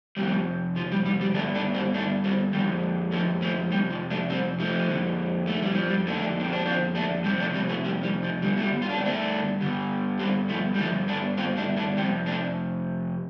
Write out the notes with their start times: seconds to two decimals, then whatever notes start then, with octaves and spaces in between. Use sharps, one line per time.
0.17 F2 C3 G3
0.76 F3
0.91 G3
1.06 G3
1.21 G3
1.35 G2 D3 A3 D4
1.54 A3 D4
1.74 G3 C4
1.94 A3 D4
2.24 G3 C4
2.52 F2 D3 G3
3.12 F3 A3
3.42 F3 A3
3.71 F2 C3 G3
3.90 F3
4.11 A3 D4
4.30 G3 C4
4.60 F3 A3
4.88 F2 D3
5.47 A3
5.62 G3
5.75 F3
5.89 G3
6.07 F2 D3 A3 D4
6.39 C4
6.53 D4
6.66 C4 F4
6.95 A3 D4
7.24 F2 C3 G3 C4
7.40 A3 D4
7.54 G3 C4
7.69 F3 A3
7.84 G3
8.03 G3
8.23 F3
8.42 G2 D3 G3
8.57 A3
8.62 G3
8.82 F4
8.89 D4
8.98 C4
9.05 A3 D4
9.60 G2 D3
10.19 G3 C4
10.49 F3 A3
10.74 G3
10.78 G2 D3 F3 A3
11.08 A3 D4
11.37 C4 F4
11.57 A3 D4
11.77 A3 D4
11.97 F2 C3 G3 C4
12.26 A3 D4